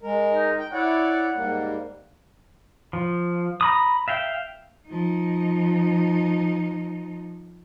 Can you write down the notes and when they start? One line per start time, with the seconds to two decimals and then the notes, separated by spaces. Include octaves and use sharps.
0.02 G#3 A#4
0.33 D#4
0.59 G5
0.73 E4 C#5 D5 F#5
1.36 G#2 G3 A#3
2.93 F3
3.61 A#5 B5 D#6
4.08 E5 F5 G5
4.88 F3 D#4